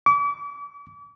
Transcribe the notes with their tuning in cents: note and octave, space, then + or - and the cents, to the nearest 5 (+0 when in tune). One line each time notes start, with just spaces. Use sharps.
D6 -40